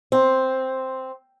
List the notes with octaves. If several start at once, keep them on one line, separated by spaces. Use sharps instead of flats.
C4